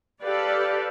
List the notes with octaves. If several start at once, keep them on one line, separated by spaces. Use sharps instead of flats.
G4 A4 B4 D5 F5